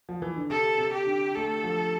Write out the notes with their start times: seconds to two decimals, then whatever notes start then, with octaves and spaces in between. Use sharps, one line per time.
0.09 F3
0.22 E3
0.36 D3
0.50 C3 A4
0.78 C3
0.93 G4
1.07 D3
1.35 A3 A4
1.64 F3